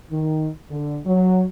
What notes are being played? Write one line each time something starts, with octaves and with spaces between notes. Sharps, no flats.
D#3
D3
F#3